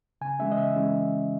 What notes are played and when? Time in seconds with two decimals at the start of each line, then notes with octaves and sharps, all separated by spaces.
0.21 C#3 G#5
0.39 E3 G#3 C#4 E5
0.52 D#5
0.58 C#3 E5
0.76 E3 G#3 C#4